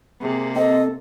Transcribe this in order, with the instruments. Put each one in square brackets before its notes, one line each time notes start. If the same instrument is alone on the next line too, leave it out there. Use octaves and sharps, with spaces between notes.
[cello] C3 A#3 [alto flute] G#4
[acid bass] C4 [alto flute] A4 [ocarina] D#5